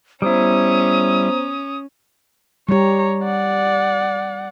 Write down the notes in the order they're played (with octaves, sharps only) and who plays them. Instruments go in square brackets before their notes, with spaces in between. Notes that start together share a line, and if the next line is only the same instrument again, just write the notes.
[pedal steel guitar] G3 E4 [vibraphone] B3 C5 A#5 [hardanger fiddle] C#4 [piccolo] D#6
[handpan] G3 G4 [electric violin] C#5 A#5
[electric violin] D5 F#5